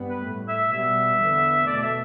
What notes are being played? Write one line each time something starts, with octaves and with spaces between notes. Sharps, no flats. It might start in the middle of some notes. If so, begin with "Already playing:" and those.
Already playing: G2 G3 B3
B4
A2 A3
E5
B2 G3 B3 E5
E2 D3 B3
B2 A3 D5
D5
E5